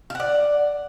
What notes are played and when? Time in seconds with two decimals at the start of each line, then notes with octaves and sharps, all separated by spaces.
0.10 F5
0.15 F#5
0.20 D5